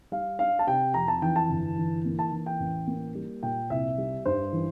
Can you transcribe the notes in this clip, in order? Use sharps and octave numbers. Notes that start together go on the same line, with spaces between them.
G3 F5
D4 F5
A5
C3 G5
F2 A#5
A5
E3 G5
A5
G1
E3
A#3
A5
E3
G5
A1
A#3
G3
A#2 G5
C2 E5
G3
G2 C5
E3